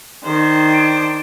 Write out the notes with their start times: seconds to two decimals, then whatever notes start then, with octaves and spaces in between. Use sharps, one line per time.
0.25 D#3 D4 C5
0.73 D7